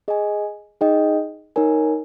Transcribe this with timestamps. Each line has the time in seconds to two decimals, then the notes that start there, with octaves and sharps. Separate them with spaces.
0.08 G#4 D#5 G#5
0.81 D#4 G#4 D#5 G5
1.56 D#4 A#4 C#5 G#5